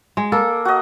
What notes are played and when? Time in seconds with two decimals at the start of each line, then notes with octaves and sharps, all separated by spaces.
0.17 G#3
0.32 A#3 A4
0.65 F#4 D#5